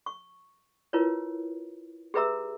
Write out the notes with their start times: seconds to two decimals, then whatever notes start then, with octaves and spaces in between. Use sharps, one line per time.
0.06 C#6
0.93 E4 F4 A#4 B4 C#5
2.14 G4 G#4 B4 E5 A#5 E6